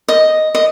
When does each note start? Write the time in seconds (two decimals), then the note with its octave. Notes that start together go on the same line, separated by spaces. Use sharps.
0.08 D#5
0.55 D#5